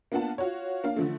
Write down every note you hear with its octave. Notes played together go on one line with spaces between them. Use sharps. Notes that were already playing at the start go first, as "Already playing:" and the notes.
A#3 B3 D4 F4 F#5 A5
F4 F#4 C#5
A#3 D4 F5
D3 F3 A3